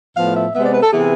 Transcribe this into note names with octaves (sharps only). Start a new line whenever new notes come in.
A2 F3 B3 F5
E5
C3 G#3 B3 E5
D5
B4
A4
C3 E3 B3 G#4